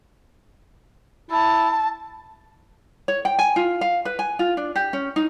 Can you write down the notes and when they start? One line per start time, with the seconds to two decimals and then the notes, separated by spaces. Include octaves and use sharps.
1.31 E4 A5
3.08 C#5
3.25 G5
3.39 G#5
3.56 F4
3.81 F5
4.05 B4
4.19 G#5
4.39 F4
4.57 D4
4.76 G4
4.93 C#4
5.16 D#4